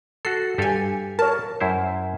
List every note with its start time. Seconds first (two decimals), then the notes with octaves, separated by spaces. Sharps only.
0.25 F#4 A4 C7
0.58 G2 G4 A4 F5 G#5
1.19 A#4 C#5 A5
1.60 F#2 E4 C5